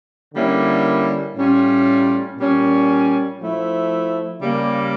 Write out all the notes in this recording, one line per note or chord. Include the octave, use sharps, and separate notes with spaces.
D3 G3 A#3 C#4 E4
A2 G3 C#4 F4
A#2 G3 C#4
F3 A3 E4
C#3 G3 A#3